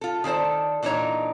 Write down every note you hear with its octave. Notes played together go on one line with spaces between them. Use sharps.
F4 A4
D#3 G#4 A4 C5 D5
A#2 E3 D4 D#4 C#5 A#5